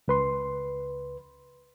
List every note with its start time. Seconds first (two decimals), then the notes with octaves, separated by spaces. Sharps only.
0.08 C#2 B4 C6